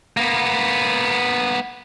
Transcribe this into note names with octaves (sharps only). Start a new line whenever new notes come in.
A#3 B3